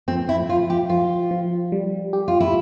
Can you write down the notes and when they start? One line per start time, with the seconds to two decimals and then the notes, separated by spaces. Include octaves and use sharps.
0.08 F3 C4
0.29 E4
0.49 F3 F4
0.70 G4
0.90 F3 F4
1.31 F3
1.72 G3
2.13 G4
2.28 F4
2.40 E4